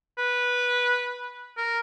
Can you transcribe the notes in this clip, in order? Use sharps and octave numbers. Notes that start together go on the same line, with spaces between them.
B4
A#4